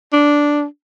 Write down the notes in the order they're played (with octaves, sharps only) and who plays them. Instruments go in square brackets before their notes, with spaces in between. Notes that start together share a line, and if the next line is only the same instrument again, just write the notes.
[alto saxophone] D4